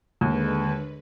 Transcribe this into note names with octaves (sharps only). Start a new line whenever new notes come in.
D#2 D3 G#3 B4